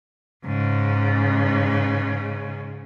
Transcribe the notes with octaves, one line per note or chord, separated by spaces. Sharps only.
G#2 C#3